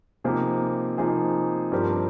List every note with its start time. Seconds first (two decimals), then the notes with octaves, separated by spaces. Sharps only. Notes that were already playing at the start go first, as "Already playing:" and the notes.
0.24 C3 F3 A#3 D#4 G#4
0.98 C3 F3 A#3 D#4 G#4
1.72 G2 F3 C4 G4 A#4